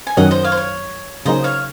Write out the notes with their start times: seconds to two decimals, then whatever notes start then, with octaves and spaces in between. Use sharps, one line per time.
0.07 G#5
0.17 F#2 D#3 F#3 C#4 D#5 F#5
0.31 C5 D#5
0.44 C#5 F5
0.52 C5
0.57 C#5
1.25 C#3 F#3 A#3 D#4 G#4 C5 D#5
1.44 C#5 F5